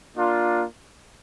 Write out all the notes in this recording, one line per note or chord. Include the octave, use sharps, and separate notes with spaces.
A#3 D4 F4